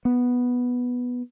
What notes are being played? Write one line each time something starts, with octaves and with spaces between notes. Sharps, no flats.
B3